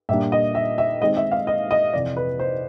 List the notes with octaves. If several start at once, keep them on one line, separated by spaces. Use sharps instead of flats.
A#2 G3 A#3 D4 E5
D#5
E5
E5
D#3 G#3 C4 D#5
E5
F5
D#5
D#5
F2 C3 E3 D5
B4
C5